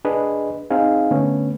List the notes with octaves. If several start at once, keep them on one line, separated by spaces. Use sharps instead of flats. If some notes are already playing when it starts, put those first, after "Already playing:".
D4 G#4 B4 D#5
C4 D#4 G#4 F5
D3 A3 B3 C#4